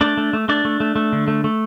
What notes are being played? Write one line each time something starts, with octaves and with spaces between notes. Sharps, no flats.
A3 D4 D5
A3
A3
A3 D4 D5
A3
A3
A3
D3
A3
A3